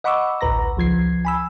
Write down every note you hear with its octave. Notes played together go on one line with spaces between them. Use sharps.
D#5 F#5 B5 C#6 D6 E6
A1 D2 B4 A#5 A#6
C#2 F3 G#6 C7
G#5 B5 E6